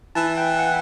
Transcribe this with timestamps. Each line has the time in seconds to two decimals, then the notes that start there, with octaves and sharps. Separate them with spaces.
0.15 E3 A5
0.37 G5
0.59 F#5